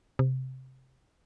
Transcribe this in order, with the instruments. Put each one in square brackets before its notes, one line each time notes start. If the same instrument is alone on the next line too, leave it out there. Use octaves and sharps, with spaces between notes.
[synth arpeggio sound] C3